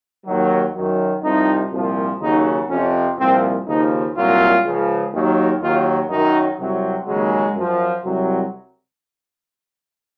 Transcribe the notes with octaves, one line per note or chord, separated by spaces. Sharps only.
D#2 D#3 F#3
F#2 D#3 F#3
C2 C3 F3 D#4
C2 A#2 F3
D#2 C#3 F#3 D#4
F2 C3 F3 C#4
C2 A#2 F3 C4
D#2 C#3 F3 D#4
C2 A#2 F#3 F4
C#2 C#3 F3
D#2 D#3 F#3
D#2 D#3 F#3 F4
F#2 D#3 F#3 D#4
C2 C3 F#3
D#2 C#3 F#3 G#3
F#2 F3
C2 C3 F#3